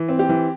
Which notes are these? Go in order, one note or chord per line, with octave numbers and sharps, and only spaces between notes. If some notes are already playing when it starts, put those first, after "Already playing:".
Already playing: E3
C4
G4
E3